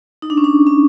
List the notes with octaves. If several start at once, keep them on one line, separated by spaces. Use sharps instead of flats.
D#4
D4
C#4
D4
C#4